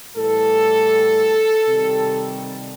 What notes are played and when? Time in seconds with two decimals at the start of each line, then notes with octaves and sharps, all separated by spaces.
0.16 A2 E3 G3 A4
1.69 C3 D#3 G3